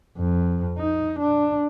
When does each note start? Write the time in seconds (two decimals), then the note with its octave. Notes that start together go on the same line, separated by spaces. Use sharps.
0.17 F2
0.78 D#4
1.19 D4